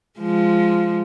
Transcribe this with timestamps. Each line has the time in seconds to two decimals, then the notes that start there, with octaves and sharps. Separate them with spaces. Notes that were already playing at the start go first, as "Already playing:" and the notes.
0.20 F3 G#3